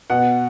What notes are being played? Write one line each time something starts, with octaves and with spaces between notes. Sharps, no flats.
B2 F#5